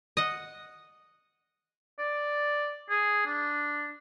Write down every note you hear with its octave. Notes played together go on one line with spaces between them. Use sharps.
D#5 F#5
D5
G#4
D4